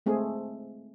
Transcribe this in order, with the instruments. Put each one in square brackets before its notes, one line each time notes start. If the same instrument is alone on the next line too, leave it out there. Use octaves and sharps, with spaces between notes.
[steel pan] G#3 A3 C4 G#4